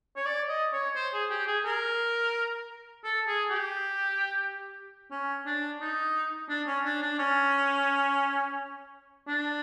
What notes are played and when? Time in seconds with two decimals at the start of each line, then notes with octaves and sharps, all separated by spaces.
0.16 C#5
0.26 D5
0.49 D#5
0.73 C#5
0.96 C5
1.13 G#4
1.30 G4
1.47 G#4
1.65 A#4
3.04 A4
3.27 G#4
3.50 G4
5.11 C#4
5.46 D4
5.81 D#4
6.49 D4
6.67 C#4
6.85 D4
7.02 D4
7.19 C#4
9.28 D4